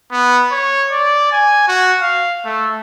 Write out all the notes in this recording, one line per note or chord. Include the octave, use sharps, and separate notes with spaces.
B3
C#5
D5
G#5
F#4
F5
A3